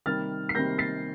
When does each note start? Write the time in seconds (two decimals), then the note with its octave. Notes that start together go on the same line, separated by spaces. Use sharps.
0.06 C3 D#3 G3 A#3 F6 A6
0.49 C7
0.55 C3 D#3 G3 A#3 G6 A#6
0.78 A6 C7